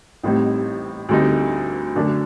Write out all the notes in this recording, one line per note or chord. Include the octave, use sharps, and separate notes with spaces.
A1 A2 G3 C4 D#4
D2 D3 G3 C4 D#4
F#2 D3 A3 D4